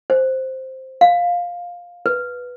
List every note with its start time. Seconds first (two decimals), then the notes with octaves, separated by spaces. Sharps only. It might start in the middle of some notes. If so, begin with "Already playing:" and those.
0.10 C5
1.01 F5
2.06 B4